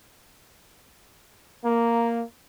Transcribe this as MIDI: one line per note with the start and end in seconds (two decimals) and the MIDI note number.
1.64 2.23 58